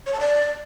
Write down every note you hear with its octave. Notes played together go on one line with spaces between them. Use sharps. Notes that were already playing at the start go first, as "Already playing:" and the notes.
C#5
A5
D5